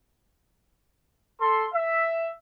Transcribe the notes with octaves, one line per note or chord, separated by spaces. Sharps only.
A4 C6
E5